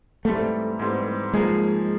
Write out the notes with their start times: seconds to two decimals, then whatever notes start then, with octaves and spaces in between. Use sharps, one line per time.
0.25 G#2 E3 G3 A3 C4
0.79 G#2 E3 G3 C4
1.33 F3 G#3 A#3 D#4 G#4